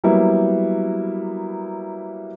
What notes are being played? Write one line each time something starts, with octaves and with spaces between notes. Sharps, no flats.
F#3 G3 A#3 B3 E4